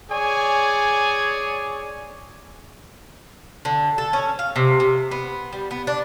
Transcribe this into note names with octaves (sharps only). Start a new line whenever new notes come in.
G#4 C#5 D5 G#5
D3
A4
C#4
F5
C3
C3
B3
G3
B3
D4